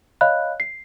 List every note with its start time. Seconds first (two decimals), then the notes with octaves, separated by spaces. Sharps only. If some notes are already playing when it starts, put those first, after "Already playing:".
0.21 C#5 D#5 F5 B5 F#6
0.60 C7